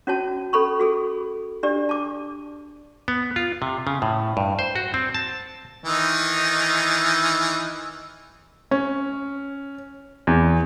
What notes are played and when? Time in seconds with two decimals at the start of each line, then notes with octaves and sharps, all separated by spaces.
0.07 C#4 F#4 C#5 A5
0.53 C#4 A4 B5 C#6
0.79 F#4 G#4 A4
1.63 D4 G4 D5
1.89 A5 D6
3.08 B3
3.36 F4
3.62 C3
3.87 C#3
4.02 A2
4.37 G2
4.59 C5
4.76 F#4
4.94 C4
5.14 A5
5.84 D#3 E3 D#4
8.71 C#4
10.27 E2